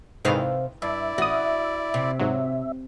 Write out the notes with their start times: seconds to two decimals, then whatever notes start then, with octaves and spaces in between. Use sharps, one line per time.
0.25 G#2 C3 D#3 E3 F5
0.82 G2 E4 D5 E5
1.18 A1 F#4 D#6
1.94 C3
2.19 G#2 F#3